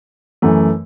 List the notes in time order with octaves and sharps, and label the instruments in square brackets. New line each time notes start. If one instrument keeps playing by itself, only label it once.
[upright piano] F#2 E3 A3